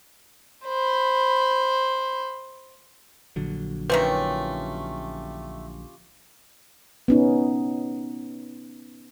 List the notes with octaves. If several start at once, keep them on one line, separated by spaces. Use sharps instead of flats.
C5 B5
A#1 D3 F#3
D#3 A3 C4 C#4 F4 G4 B4
B3 C#4 D#4